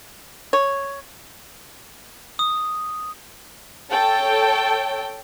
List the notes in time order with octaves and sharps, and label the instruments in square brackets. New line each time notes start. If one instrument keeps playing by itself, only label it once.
[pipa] C#5
[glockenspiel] D#6
[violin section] A4 C#5 G5 A5